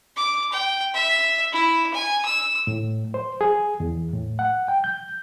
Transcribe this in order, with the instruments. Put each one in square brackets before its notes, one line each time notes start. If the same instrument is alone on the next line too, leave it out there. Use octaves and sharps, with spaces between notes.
[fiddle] D6
G5
E5
E4
G#5
E6
[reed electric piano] A2
C5
G#4
E2
A2
F#5
G5
G6